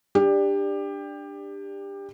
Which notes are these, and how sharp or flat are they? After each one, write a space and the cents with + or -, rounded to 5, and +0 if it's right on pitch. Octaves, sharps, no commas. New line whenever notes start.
D4 +10 G4 +20 D5 +0